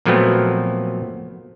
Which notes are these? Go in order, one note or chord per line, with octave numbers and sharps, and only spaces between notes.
A#2 F3 F#3 A3 B3 C4